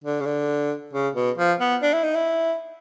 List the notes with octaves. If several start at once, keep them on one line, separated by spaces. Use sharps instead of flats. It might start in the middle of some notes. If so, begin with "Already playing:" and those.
D3
C#3
D3
C#3
B2
F3
B3
D4
E4
D#4
E4